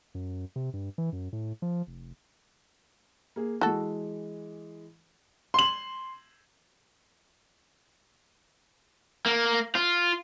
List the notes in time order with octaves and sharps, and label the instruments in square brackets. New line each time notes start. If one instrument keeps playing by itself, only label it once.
[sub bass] F#2
C3
G2
E3
F#2
A2
F3
F1
[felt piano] A#3 G#4
[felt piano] E3 G#3 [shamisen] F#4 A4
[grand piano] C6 F#7
[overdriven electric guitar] A#3
F4